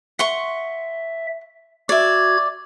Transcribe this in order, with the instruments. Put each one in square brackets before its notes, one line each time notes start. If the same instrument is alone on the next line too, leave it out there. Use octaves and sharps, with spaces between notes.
[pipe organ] E5 [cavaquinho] F#5 C6 C#6
[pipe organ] F#4 G#6 [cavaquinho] D5 E5